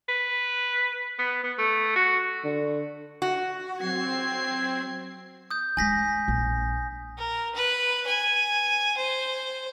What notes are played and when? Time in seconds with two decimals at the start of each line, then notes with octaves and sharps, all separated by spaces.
0.09 B4
1.19 B3
1.44 B3
1.58 A3
1.96 F#4
2.44 D3
3.22 F#4
3.81 F#3 C4 G#6 C7
5.51 D#6 G6
5.77 G#3 D#4 G#5 A#6 B6
6.28 A#1
7.18 A#4
7.54 B4
8.07 G#5
8.97 C5